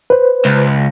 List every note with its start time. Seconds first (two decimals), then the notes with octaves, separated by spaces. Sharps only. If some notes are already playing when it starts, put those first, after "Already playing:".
0.10 B4 C5
0.45 C#2